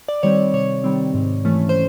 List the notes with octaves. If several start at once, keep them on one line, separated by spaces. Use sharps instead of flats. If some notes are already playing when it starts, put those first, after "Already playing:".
D5
D#3 G3 C4 C#5
C3 C#5
D#3 G3 C4
G#2
E3 A3 C#4
C5